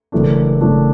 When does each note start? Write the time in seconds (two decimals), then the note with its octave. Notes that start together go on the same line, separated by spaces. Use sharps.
0.12 F#1 F#2 E3 A3 D4
0.61 F#1 F#2 E3 A3 D4